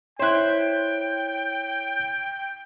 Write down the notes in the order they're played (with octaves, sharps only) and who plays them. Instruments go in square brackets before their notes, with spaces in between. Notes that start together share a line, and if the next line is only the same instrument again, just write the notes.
[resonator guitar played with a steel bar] E4 C5 [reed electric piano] C#5 F#6 [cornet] G5